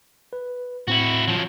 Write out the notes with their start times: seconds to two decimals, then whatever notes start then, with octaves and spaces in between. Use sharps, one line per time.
0.33 B4
0.88 A2 C4 E4 F#4 B5
1.28 F3 F#3